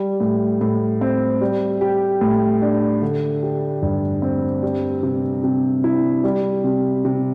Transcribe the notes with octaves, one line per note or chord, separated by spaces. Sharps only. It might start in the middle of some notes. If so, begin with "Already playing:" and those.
Already playing: G3
A2
A2
C4
G3
G4
A2
D4
D3
G4
G2
C4
G3
C3
C3
E4
G3
C3
C3